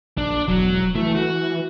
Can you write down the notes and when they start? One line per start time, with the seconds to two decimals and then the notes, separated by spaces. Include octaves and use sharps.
0.18 A#1 D4
0.48 E1 F#3
0.95 E3 A3
1.15 F#4